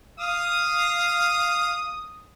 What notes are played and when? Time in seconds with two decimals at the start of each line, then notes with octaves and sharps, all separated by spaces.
0.20 F5 D#6